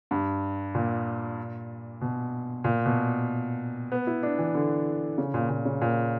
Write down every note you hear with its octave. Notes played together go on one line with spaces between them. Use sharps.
G2
A#2
B2
A#2
B2
B3
E4
D4
E3
D3
C#3
A#2
A#2
C#3
A#2